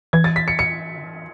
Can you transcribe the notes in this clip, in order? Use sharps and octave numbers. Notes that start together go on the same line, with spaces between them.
E3 G#6
A6
B6
C#7
C#7
D3
E3